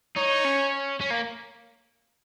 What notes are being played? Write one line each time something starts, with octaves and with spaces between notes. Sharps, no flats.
D#4 C#5
C#4
C#4
A#3